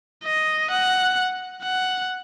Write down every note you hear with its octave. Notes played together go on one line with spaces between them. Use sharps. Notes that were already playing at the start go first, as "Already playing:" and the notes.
D#5
F#5
F#5